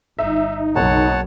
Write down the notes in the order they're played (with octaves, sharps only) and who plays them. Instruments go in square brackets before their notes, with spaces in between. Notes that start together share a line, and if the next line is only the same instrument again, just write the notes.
[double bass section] G1 [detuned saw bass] D#4 [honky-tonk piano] E5
[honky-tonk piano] F#1 [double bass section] B1 F#3 [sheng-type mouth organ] C#5 F#5 A5